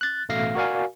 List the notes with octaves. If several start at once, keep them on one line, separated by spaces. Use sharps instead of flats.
F#6 A6
A1 B2 A3 F5 A#6 C7
F#4 A#4 D5 F5 G#5